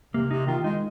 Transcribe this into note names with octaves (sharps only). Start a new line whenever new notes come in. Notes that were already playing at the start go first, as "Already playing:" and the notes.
C3 A#3
C3 D#4
D#3 F4
G#3 D#4